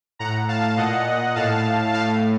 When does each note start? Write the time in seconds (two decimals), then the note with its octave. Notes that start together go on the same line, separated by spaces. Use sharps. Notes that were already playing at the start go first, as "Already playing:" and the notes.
0.19 A2 F#5 A#5
0.48 F5 A5
0.77 A#2 D#5 F#5
1.35 A2 F5 A5
1.92 A2 F5 A5